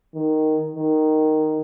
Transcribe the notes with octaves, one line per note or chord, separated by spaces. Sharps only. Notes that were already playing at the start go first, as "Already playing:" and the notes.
D#3
D#3